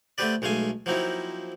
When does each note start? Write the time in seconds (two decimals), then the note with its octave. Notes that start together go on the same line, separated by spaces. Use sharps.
0.18 A3 B3 C4 G4 B4 D5
0.42 B1 G#3 A3 F5 G#5
0.86 F3 F#3 A#3 C4 D#4 E4